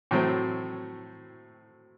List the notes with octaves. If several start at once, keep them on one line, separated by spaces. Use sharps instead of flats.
A2 F#3 A3 C4